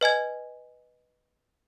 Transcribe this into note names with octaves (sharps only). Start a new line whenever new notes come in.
B4 D#5 G#5 G#6